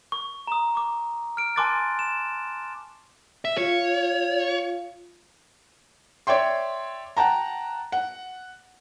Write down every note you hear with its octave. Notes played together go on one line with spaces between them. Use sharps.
C#6
A#5 D#6
C#6 D6
F6 D7
G#5 A5 C6 D6 F#6 A6
E7
E5
F4 C#5 F5
C#5 D5 E5 G5 C6
F#5 G5 A5 A#5
F#5